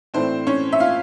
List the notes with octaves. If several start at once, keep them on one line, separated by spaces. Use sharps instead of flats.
A2 E3 A3 C4 D4 C5
C#4 C#5
E5
F4 F5